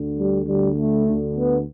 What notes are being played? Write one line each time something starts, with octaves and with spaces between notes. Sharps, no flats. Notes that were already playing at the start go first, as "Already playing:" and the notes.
Already playing: D2 D3
G3
D2 D3 G3
A3
D2 D3
B3